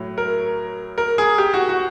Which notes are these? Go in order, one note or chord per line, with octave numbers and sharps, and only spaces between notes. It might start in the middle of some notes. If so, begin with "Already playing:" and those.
Already playing: A2 F#3
A#4
A#4
G#4
G4
F#4
F#4